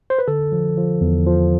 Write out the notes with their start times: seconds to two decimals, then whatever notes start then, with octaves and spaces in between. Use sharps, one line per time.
0.10 C5
0.19 B4
0.28 D3 A4
0.52 F3
0.77 F3
1.01 E2
1.27 F3